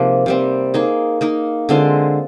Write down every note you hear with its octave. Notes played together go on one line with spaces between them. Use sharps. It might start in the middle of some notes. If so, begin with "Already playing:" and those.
Already playing: C3 F3 A#3 D#4 G#4
C3 G3 C4
A#3 D#4 G#4
A#3 D#4 A#4
D3 G#3 C4 F4